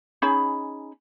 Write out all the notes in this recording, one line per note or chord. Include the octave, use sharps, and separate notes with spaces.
C#4 D#4 G#4 B5